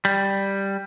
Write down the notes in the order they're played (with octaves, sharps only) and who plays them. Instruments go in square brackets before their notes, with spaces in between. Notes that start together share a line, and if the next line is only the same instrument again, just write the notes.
[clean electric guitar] G3